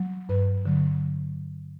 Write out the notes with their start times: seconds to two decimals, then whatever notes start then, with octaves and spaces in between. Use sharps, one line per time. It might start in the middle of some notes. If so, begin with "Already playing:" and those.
Already playing: F#3
0.29 G2 B4
0.66 D3 F#3